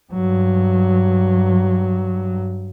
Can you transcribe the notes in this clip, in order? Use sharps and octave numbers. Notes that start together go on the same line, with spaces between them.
G2 F#3